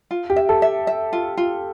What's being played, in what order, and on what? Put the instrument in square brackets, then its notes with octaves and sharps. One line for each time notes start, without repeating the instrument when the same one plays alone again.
[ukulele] F4
[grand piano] G4
[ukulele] E5
[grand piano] A4
[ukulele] E5
E5
F4
F4